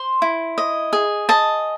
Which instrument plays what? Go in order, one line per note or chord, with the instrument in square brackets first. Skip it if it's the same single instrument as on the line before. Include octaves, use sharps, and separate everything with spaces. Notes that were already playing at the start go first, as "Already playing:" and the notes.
Already playing: [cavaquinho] C5 C6
E4
D#5
G#4
D#5 A5